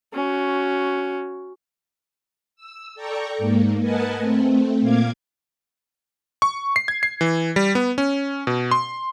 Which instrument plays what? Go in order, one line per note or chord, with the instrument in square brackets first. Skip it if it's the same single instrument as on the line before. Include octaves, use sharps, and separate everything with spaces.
[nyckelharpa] C#4 F#4
[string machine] E6
A4 D5 G5 A#5 C#6
G#2 A#3
A#4 B4 D#5 F#5 G#5 A5
A3 C4
A#2 A#3 F5 D6 G#6
[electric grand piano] C#6
C7
G#6
C7
E3
G3
B3
C#4
B2
C6